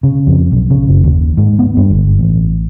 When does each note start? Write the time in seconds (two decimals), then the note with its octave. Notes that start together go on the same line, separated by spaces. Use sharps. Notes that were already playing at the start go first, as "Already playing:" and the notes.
0.03 C#3
0.27 F2
0.52 B1
0.70 C#3
0.88 F#1
1.04 D#2
1.37 G#2
1.59 B3
1.77 G2
1.91 G1
2.19 A1